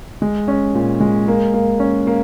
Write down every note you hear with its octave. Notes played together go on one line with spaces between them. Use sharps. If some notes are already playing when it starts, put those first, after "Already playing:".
G#3
C#4
A#2
G#3
A#3
A#3
C#4
A#3